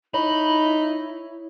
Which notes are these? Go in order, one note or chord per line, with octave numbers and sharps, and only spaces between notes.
D#4 E4 C#5 B5